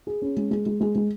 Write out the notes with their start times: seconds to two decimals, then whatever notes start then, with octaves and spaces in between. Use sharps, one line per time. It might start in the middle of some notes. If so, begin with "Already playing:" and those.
0.07 G#4
0.22 C#4
0.37 G#3
0.51 G#3
0.66 G#3
0.81 G#3
0.95 G#3